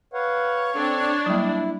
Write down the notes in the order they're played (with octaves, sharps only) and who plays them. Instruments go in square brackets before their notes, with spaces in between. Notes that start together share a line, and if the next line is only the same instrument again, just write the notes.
[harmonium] B4 F5 F#5 [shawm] C#5
[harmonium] C4 A4 D5 [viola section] D4
[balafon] F#3 G3 A#3 [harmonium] E4